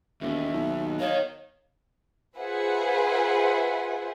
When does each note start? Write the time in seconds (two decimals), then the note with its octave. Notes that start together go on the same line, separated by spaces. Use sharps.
0.21 E1 D#2 E5
0.53 B1
1.00 A#4 C#5 D#5 F5
2.38 F4 G#4 B4 C5 E5 F#5